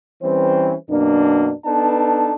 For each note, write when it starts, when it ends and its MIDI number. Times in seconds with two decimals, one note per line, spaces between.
0.22 0.73 52
0.22 0.73 55
0.22 0.73 60
0.22 0.73 61
0.22 0.73 71
0.22 0.73 72
0.90 1.51 42
0.90 1.51 47
0.90 1.51 58
0.90 1.51 62
1.66 2.34 59
1.66 2.34 62
1.66 2.34 63
1.66 2.34 69
1.66 2.34 71
1.66 2.34 81